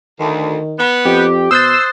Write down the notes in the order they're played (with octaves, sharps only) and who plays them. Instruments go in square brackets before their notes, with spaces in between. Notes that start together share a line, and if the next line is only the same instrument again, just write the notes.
[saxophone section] D2 [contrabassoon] D#3
[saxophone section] B3
[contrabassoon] F2 [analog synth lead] G4
[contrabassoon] B2 [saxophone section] C5 [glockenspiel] D#6 F#6 A6 [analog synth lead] E6